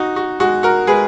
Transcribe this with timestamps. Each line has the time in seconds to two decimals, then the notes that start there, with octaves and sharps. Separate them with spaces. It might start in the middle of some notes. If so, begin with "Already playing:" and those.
Already playing: D#4 F#4
0.16 F#4
0.40 G#3 F#4
0.63 F#4 A#4
0.87 G#3 G#4 B4